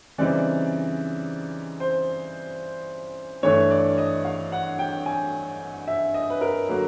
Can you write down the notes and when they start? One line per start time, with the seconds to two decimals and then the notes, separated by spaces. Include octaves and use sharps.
0.18 C#3 E3 G3 C4 D#4 D5
1.80 C5
3.43 G2 E3 A3 D4 C#5
3.71 D5
3.98 D#5
4.25 F5
4.52 F#5
4.79 G5
5.06 G#5
5.87 E5
6.14 D#5
6.30 B4
6.41 A#4
6.69 D3 F#3 A#3